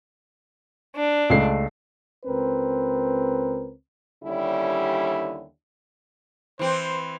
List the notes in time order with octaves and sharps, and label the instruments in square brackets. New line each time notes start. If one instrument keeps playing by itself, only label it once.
[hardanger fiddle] D4
[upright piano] C#2 A3 C7
[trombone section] C#2 C4 A#4 B4
[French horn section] D#2 D3 G3 C#4 E4
[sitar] E3 C4 [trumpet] C5